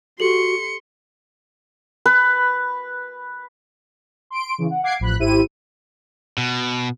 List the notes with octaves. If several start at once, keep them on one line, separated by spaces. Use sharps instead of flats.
F#4 G4 A4 C6 C#7 F#7
B4
C6 D7
C#3 E3
F#5
F5 F#5 D6 G#6 C7 D7
A1 F3 B5 F#6
G#1 E4 G4 C5 D#7
B2